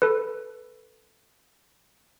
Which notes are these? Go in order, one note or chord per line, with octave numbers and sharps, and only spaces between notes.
A4 B4